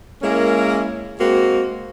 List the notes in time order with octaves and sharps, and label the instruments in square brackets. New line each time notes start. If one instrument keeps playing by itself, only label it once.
[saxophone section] G#3 A#3 C#4 E4 A#4
G#3 A#3 C4 F#4